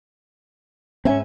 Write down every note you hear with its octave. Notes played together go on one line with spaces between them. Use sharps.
G#2 C4 C#4 E5 G#5